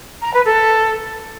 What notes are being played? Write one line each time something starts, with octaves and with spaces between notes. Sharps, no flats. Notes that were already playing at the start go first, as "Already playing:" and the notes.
A#5
B4
A4